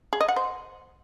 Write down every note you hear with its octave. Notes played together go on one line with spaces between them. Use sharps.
G#4
D#5
F#5
C5